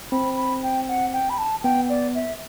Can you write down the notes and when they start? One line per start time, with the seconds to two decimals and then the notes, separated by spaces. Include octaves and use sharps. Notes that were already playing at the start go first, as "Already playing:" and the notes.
0.12 C4 B5
0.36 B5
0.63 G5
0.88 F#5
1.13 G5
1.30 B5
1.38 A5
1.63 B3 G5
1.89 D5
2.15 E5